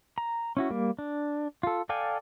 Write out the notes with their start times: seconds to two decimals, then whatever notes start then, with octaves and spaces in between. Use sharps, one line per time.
0.18 A#5
0.57 C#4 E4 F#4
0.70 G3 A#3
0.99 D4
1.63 F4 A4
1.89 A4 D5 F5 G5 G#5